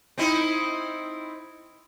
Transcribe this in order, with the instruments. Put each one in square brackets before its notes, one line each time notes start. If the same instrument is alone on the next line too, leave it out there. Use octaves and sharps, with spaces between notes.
[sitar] C4 D#4 E4